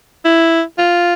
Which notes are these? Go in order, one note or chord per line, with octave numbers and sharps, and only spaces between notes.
E4
F4